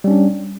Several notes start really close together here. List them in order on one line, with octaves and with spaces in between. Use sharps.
G3 C#4 D4